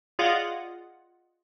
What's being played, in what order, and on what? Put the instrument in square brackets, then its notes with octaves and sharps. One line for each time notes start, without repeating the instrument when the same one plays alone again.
[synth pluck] F4 G#4 D5 D#5 F5 F#5